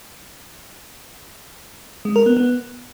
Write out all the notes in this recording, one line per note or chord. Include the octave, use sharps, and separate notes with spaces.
G#3
A#4
B3
B3